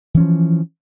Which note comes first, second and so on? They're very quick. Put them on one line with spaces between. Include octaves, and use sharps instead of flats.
E3 C#4 F3